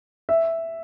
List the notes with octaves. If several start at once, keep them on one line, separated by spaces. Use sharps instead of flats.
E5